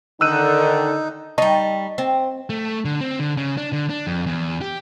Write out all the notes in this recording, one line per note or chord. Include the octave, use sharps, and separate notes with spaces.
D3 D#3 D#4 E6 F#6 D#7
G3 D#4 D#5 A5 C#6
C4
A3
D3
C4
D3
C#3
D4
D3
D4
F2
E2
G4